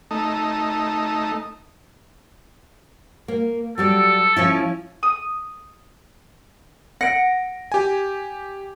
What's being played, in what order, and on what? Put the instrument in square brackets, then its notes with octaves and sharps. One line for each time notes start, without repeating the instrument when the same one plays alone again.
[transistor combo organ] A3 D#4
[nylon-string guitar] A#3
[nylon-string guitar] F#3 G3 D5 [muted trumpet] A4
[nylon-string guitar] F3 C#4 E4
[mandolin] D#6
[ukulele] F#5 [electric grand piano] A#6 D7
[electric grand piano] G4 G#5